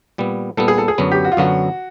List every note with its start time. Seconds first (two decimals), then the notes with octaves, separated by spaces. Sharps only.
0.18 A#2 G3 B3
0.57 A#2 G3 B3 A4
0.68 G#4
0.78 A4
0.88 G#4
0.98 F#2 D3 F#3 B3
1.11 G4
1.25 F#4
1.32 F4
1.37 F#2 D3 F#3 B3 F#4